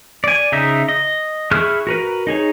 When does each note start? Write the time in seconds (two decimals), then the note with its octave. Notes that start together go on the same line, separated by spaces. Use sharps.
0.24 D5 G#5
0.52 C#3 D#4 E5
0.89 D#5
1.51 E4 G#4 C#6 F6 F#6
1.87 F#4 A#4 B4
2.27 D#4 G#4 C#5